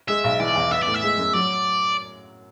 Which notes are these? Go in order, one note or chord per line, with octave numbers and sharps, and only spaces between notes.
G#3 E5
B1
E3 D5
E2
B3 E5
A2 D5
E5
G#3
F#2
F#3 D5